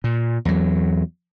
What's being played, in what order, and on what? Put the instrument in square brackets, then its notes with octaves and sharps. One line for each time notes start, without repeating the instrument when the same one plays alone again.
[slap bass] A#2
E2 F#3